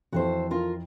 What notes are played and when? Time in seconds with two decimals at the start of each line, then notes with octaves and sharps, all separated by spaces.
0.13 F2 E3 F#4 A4 C5
0.51 F4 A#4